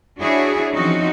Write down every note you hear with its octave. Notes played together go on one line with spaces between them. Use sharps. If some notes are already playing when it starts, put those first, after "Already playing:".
D4 E4 F#4 G#4 C#5
E3 F3 C4 C#4 D#4 F#4